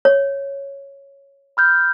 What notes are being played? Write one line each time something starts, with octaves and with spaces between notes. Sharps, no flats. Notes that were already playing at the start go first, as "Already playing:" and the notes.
C#5
B5 F6 G6